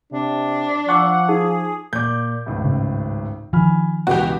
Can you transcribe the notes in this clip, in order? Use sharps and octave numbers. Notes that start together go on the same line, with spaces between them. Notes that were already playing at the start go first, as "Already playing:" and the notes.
C3 D4
F3 F#5 C#6 D6 E6
D#4 G#4
A#2 D5 D6 G6
G#1 C#2 A2
C#3
D#3 F3 G#5 B5 F6
C#2 B2 E3 F#4 G4